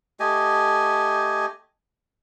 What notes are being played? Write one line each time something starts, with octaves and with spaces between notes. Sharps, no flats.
A3 G4 D#5 G#5